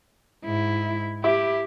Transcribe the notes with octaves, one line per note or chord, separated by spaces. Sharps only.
G#2 E4
E4 G4